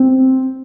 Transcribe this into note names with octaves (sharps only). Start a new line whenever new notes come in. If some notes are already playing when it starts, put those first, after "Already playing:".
Already playing: C4